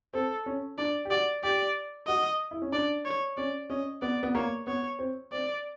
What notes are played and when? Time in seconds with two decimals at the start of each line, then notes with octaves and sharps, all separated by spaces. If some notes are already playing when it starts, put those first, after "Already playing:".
0.14 C4 A4
0.46 C#4
0.78 D4 D5
1.05 G4
1.11 F#4 D5
1.43 G4 D5
2.07 F#4 D#5
2.51 E4
2.62 C#4
2.72 D4 D5
3.05 C#5
3.37 C#4 D5
3.70 C#4 D#5
4.02 B3 D5
4.23 B3
4.35 A#3 C#5
4.67 B3 C#5
4.99 C4
5.32 C4 D5